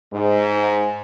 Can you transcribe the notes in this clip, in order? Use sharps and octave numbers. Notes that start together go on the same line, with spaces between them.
G#2